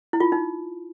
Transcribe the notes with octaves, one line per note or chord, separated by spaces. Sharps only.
E4
F4
D#4